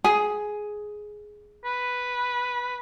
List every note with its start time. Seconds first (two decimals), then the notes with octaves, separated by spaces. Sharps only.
0.04 G#4
1.64 B4